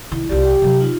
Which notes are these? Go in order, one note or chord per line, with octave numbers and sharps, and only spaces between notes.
C2 D#3 E4
C2 F4 G4 D5
G4 G5
C3 F#3
D#4 F4